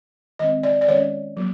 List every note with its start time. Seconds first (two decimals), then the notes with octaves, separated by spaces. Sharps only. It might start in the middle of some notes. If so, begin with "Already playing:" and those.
0.39 D#3 G#3 C4 D#5
0.63 D5
0.81 D5
0.88 D#3 G#3 C#4 C#5
1.37 F#3 A#3